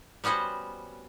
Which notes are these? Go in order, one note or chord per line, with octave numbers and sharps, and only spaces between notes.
G3 B3 C#4 F#4 C5